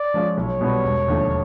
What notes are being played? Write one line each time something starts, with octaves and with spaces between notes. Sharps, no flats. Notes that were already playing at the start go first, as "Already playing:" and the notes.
Already playing: D5
F3 G#3 C#4 F4
B1 C#5
B2 G3 B3
E1
D#2 D3 F3 A3